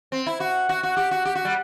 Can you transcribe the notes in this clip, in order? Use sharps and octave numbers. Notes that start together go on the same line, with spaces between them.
C4
E4
F#4
F#4
F#4
G4
F#4
G4
F#4
G3